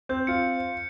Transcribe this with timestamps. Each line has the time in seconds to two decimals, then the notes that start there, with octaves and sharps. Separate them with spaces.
0.09 C4 G6
0.27 F4 C#7